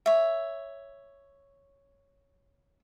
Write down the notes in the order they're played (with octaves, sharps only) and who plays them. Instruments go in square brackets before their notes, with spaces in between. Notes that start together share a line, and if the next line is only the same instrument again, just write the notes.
[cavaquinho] C#5 E5